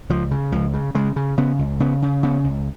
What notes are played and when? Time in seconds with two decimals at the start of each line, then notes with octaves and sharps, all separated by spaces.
0.10 C#2 F3
0.31 C#3
0.52 C#2 F3
0.74 C#3
0.95 C#3 G#3
1.16 C#3
1.37 C#3 B3
1.59 C#2
1.80 C#3 B3
2.02 C#3
2.23 C#3 B3
2.44 C#2